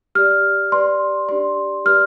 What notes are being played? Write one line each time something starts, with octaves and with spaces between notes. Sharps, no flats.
G4 D5 F6
G4 B4 D5 C6
D4 G4 D5 C6
G4 B4 D5 F6